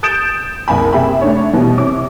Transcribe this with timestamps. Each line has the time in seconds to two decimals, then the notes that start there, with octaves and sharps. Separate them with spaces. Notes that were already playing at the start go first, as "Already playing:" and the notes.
0.03 D#6 G6 A6 D7 E7
0.68 F#1 C2 G#5 B5
0.93 F#1 C3 G#4 E5 G5 B5
1.21 A3 D4 C#5
1.53 B2 E3 G3
1.78 C3 C#5 D6